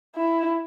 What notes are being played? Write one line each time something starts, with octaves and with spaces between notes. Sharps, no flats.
E4